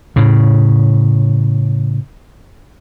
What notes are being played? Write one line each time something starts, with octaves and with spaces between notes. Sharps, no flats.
A2 C#3